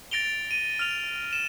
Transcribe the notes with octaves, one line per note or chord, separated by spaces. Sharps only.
A6 A#6 D7 F7 G7
D#7
F6 F7
E7